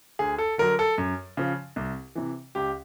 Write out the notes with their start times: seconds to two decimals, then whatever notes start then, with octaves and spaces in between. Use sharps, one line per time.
0.19 D2 G#4
0.38 A4
0.58 D3 F#3 A#4
0.79 A4
0.98 F#2
1.37 C#3 F3
1.76 C2
2.15 C3 E3
2.55 C#2 G4